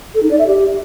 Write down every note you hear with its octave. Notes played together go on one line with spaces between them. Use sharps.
A4
D#4
D5
E5
G4